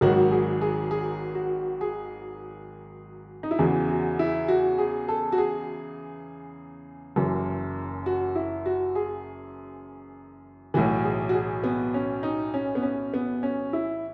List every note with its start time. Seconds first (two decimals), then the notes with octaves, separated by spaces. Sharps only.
0.01 G#1 G#2 D#3 F#3 F#4
0.31 G#4
0.61 G#4
0.91 G#4
1.35 F#4
1.81 G#4
3.43 D#4
3.51 E4
3.59 E2 C#3 E3 F#4
3.89 F#4
4.19 E4
4.48 F#4
4.78 G#4
5.08 A4
5.32 F#4
5.38 G#4
7.16 F#1 F#2 E3
8.06 F#4
8.36 E4
8.66 F#4
8.95 G#4
10.74 B1 A2 E3 F#4
11.04 G#4
11.29 F#4
11.34 G#4
11.64 B3
11.94 C#4
12.23 D#4
12.54 C#4
12.75 B3
12.83 C#4
13.14 B3
13.43 C#4
13.73 E4